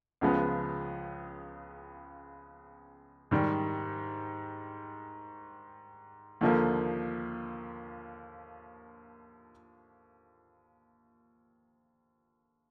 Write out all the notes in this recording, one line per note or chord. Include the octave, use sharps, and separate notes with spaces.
C#2 C#3 F3 G#3 B3
G#2 D#3 G3
D#2 D3 F3 A#3